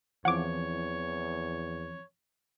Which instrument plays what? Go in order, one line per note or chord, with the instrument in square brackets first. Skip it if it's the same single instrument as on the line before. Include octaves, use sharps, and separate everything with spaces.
[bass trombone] E2 [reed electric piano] E3 F3 C4 [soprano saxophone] C#5 [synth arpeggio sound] F#5 D6